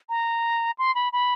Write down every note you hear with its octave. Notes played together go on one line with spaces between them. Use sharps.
A#5
C6
B5
B5